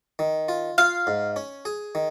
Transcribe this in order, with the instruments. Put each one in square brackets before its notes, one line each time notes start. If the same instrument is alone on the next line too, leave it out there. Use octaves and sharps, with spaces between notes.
[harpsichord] D#3
F4
[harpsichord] F4 [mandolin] F5
[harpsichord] G#2
C#4
G#4
D#3